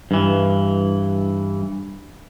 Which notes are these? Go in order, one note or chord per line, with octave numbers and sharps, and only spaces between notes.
G2 E3